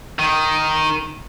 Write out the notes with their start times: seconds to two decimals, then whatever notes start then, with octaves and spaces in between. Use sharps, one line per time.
0.19 D#3